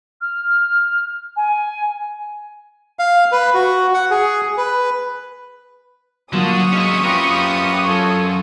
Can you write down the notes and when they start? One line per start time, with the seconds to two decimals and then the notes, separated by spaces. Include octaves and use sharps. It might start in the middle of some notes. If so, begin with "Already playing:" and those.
0.21 F6
1.37 G#5
2.99 F5
3.32 B4
3.54 F#4
3.94 F#5
4.11 G#4
4.58 B4
6.33 D3 F#3 A#3 F4 C#6 D#6
6.72 G#3 C#4 E5
7.04 F#2 F4 G4 A#4 B4
7.87 F4 A4 C#5